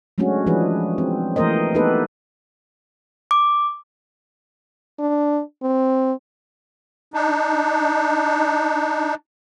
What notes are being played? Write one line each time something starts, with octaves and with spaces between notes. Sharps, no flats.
F#3 G#3 A3 C#4 D4 F#4
E3 F3 G#3 D4 G#4 B4
C4
E3 A3 A#3 A#4 C5 D#5
A3 B3 D#4 G4 A4 B4
D6
D4
C4
D4 D#4